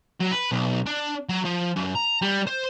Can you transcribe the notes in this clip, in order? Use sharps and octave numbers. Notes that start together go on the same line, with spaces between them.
F#3
B4
B1
D4
F#3
F3
F#2
A#5
G3
C5